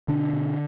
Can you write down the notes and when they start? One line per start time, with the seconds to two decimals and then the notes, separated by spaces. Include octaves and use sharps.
0.08 B2 D3 D4
0.33 B2